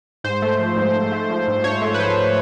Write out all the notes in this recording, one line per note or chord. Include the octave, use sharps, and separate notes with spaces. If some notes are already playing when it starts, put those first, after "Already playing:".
G#2 C5
A3
F3
G#2
G#2
A3
F3
G#2
G#2 C#5
A3
B4
F3 C5